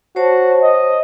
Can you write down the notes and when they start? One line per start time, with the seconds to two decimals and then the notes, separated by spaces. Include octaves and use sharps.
0.16 F#4 C5 C#5 A5
0.62 D#5